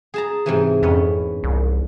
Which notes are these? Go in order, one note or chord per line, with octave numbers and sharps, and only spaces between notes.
G#4 A5 A#5
G#2 C3 E3
F2 B3 C#4
C2